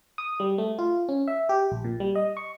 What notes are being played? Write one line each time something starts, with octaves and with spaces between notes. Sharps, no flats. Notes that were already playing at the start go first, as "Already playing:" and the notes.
D#6
G3
A3
F4
C#4
E5
G4
A#1
A#2
G3
D#5
C#6